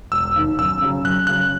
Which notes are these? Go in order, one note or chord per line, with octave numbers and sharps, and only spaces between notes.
E1 E6
D#2 D#3
F#2 E6
C#3 F#3
F#2 F#6
C#3 F#3 F#6